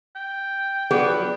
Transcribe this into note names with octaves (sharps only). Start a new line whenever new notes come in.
G5
F3 F#3 B3 D4 G#4 D5